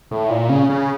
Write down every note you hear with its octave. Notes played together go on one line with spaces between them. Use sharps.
A2
A#2
C#3
C#3